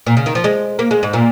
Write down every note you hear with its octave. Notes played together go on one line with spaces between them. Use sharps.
A#2
C#3
D#3
F3
G#3
A#3
G#3
G#2
A#2